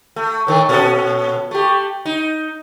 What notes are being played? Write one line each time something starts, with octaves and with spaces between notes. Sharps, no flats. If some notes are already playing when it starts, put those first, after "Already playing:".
A3
A2 D#3 A3
A#2 C#4 A4
A3 G4
D#4